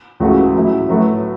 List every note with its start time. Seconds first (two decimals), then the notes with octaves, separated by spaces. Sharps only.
0.20 C#2 C#3 E3 A3 F#4
0.54 A2 F#3 C#4 E4
0.89 A2 F#3 A3 F#4 B4